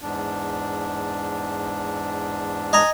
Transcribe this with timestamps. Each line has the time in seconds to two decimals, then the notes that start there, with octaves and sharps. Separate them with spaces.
0.02 E2 G#2 D4
2.73 D#5 G#5 A#5